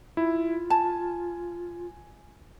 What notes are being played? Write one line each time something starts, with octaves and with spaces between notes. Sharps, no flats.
E4 F4
G#5 A5